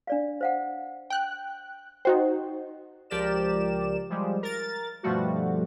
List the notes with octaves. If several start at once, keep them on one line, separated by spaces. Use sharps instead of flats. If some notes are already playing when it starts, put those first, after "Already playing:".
D4 D5 F5
C5 F5 F#5
G5 F#6
D#4 F#4 C5 D#5 G5
C#2 F3 G4 A#4 D5 E7
F3 G3 G#3
A#4 A6
G2 B2 F3 G3 A3 F#4